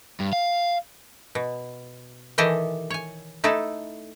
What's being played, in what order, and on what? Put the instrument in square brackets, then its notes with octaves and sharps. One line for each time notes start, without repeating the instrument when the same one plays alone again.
[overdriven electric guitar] G2
F5
[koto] B2
D#3 E3 G4 A4 D#5 G#5
C#5 G#5
A3 D#4 E4 A4